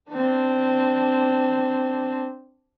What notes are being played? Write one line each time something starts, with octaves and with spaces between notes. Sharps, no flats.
C4 D4